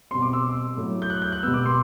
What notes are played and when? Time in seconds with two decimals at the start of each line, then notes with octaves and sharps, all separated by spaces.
0.11 B2 G3 C4 C6
0.22 D6
0.33 E6
0.77 A2 F#3 A3
1.02 G6
1.10 F#6
1.22 G6
1.32 F#6
1.43 B2 G3 B3 E6
1.54 D6
1.66 C6